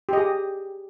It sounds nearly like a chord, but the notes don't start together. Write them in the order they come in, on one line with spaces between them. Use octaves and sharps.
G4 D#5 G#4